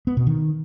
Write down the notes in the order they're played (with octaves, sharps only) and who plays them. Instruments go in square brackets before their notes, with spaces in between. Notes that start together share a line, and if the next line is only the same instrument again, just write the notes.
[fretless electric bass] B3
B2
D#3